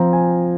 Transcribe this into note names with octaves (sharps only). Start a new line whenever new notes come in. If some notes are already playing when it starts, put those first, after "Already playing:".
Already playing: F3 C4 F4 A#5
G#5